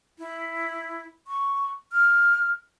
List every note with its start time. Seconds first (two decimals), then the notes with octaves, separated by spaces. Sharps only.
0.19 E4
1.27 C#6
1.92 F6